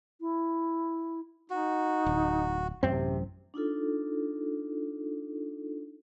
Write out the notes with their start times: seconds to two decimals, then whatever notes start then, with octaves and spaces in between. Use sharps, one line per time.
0.21 E4
1.50 D#4 F#4
2.06 D1
2.83 A1 F#2 C3 C4
3.54 D4 D#4 F4 A4